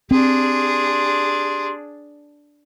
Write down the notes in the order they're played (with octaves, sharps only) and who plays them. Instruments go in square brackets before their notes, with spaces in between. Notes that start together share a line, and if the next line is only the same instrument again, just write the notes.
[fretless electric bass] C4 [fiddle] D4 G#4 [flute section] G4 C6